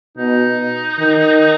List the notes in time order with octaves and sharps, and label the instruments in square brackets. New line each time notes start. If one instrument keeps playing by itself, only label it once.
[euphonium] B2 [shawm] D#4
[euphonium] D#3